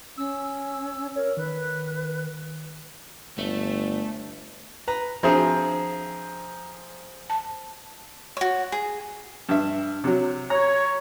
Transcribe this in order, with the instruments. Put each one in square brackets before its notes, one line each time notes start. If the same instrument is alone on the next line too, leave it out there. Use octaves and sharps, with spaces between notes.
[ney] C#4 [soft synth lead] E6
[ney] A#4 [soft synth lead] C#5
[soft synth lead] D#3 [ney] B4
[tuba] G1 [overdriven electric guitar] A3
[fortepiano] B4 A#5
[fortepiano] F3 C4 G#4 [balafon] D4 F#4 E5 [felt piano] A#5
[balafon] A5
[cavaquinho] F#4 C#5
G#4
[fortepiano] G2 E5
C3 F#3
[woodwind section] C#5 [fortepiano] A#5